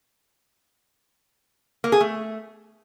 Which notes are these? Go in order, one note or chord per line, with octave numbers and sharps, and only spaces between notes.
A#3
G#4
A3